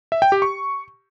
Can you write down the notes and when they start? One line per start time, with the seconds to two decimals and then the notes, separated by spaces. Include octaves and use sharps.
0.12 E5
0.22 G5
0.32 G4
0.42 C#6